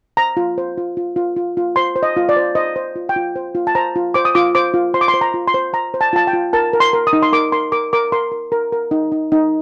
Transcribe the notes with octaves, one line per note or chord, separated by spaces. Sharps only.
C5 A#5
F4
C5
F4
F4
F4
F4
F4
C5 C6
C5
D#5
F4
D5
C5
C5 D#5
C5
F4
G5
F4
C5
F4
A5
C5 A#5
F4
C5 D6
D#6
F4 D6
C5 D6
F4
C5 C6
D6
C6
C5
A#5
F4
C6
C5
C5 A#5
C5
A5
F4 A5
G5
F4
A#4 A5
A#4
C6
A#4
D#6
D#4
C6
A#4 D6
A#4 C6
A#4 D6
A#4 D6
A#4 C6
A#4
A#4
A#4
D#4
D#4
D#4